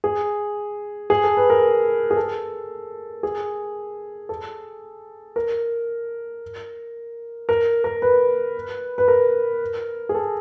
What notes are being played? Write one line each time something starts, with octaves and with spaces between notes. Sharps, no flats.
G#4
G#4
A4
B4
A#4
G#4
A4
G#4
A4
A#4
A#4
A#4
B4
B4
A#4
G#4
A4